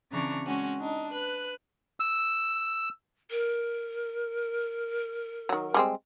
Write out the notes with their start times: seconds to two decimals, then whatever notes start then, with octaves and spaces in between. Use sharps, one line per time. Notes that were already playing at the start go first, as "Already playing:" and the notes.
0.11 C#3 E3 C4 D4 A#5 C#6
0.46 G#3 C4 C#4 F#4
0.79 D4 D#4
1.12 B4 F#6
2.00 E6
3.30 A#4
5.49 D#3 F#3
5.74 G3 G#3 C4